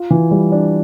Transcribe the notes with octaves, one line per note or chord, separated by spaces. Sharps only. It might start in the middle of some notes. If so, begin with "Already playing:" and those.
Already playing: F4
E3
G3
D4